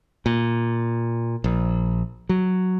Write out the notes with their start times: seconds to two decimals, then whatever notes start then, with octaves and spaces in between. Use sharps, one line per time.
0.26 A#2
1.44 A#1
2.29 F#3